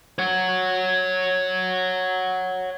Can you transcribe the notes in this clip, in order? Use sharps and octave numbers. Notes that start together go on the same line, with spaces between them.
C#5 F#5